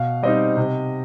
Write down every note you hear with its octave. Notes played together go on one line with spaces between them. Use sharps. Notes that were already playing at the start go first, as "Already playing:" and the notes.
Already playing: B2 F5
G3 C4 D#4 D#5
C3